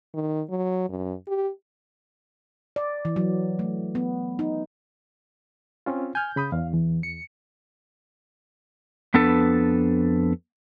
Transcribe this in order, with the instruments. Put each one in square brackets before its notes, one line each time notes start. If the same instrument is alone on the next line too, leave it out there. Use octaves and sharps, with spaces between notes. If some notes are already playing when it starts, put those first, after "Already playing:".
[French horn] D#3
F#3
F#2
G4
[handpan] D5
E3
F#3
A3
B3
D#4
[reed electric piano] C4 C#4 F4
[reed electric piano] G#5 F6 [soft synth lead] G6
[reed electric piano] C#3 B5 D#6
[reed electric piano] E2 [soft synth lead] F5
[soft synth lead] E3
C#7
[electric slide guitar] F2 B3 D4 A4 B4